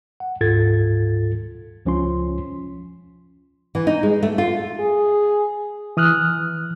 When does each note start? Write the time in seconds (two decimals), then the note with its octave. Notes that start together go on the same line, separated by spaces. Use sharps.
0.20 F#5
0.41 D2 G#2 F4 A4 G#6 A6
1.86 C#2 F3 C#4 F4 C6
3.75 E3
3.87 D#4
4.03 G#3
4.23 A3
4.38 F4
4.79 G#4
5.97 E3 D#6 F6 F#6